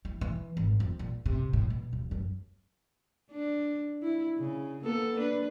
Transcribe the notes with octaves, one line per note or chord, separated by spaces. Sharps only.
E4
E3
G#1
F2
A#1
C3
A2
B2
D1
F#2
D4
E4
C#3
A#3 B3 A4
D4 B4